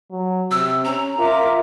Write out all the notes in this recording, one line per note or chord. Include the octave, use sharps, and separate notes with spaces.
F#3
C3 E6
C#4 A#5
F4 A#4 E5 D6